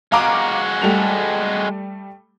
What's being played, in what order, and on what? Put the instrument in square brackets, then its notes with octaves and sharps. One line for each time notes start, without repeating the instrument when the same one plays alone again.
[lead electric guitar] G#3 F#4 [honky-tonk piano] F5 A#5 D6
[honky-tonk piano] G3 A3 F7